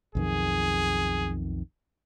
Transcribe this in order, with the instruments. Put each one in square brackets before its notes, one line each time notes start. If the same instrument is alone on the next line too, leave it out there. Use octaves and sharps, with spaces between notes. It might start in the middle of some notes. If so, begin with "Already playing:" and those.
[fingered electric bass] B1 F2 D#3 [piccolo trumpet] G#4